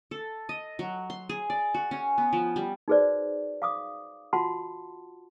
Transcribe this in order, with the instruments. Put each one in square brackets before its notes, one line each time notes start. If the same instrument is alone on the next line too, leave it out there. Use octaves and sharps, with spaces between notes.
[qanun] A4
D#5
F#3
C6
G#4
D5
F#4
C#4
B3
F3
G3
[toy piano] D#4 F#4 G#4 B4 C5 D5
F5 D6 D#6
F4 F#4 F#5 A5 C6